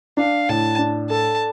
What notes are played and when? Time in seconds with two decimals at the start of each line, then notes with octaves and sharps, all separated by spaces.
0.17 D4 F5
0.49 A2 A5
0.79 D4
1.10 A4 A5